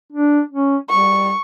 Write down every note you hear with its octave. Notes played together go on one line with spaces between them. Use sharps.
D4
C#4
G3 C#6